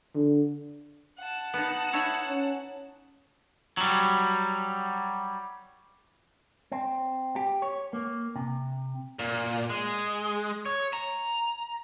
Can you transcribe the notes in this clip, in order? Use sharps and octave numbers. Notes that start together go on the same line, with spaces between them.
D3
F#5 A5
B3 D#4
D#4 E4 C#5
C#4
F#3 G3
C4
G4
C#5
A#3
C3
A#2
G#3
C#5
A#5